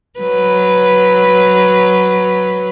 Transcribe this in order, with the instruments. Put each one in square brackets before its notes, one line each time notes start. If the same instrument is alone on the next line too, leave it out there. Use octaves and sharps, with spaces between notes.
[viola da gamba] F#3 B4